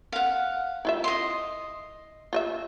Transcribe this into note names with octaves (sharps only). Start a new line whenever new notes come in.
F5 F#5
E4 F4 E5
D#5 C6
F4 D#5 E5